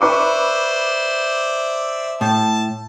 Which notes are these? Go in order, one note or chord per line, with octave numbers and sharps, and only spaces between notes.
B4 C5 D5 E5 C#6 D6
A2 A5